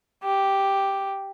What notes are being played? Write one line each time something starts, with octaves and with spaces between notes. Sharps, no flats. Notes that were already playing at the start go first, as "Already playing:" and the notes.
G4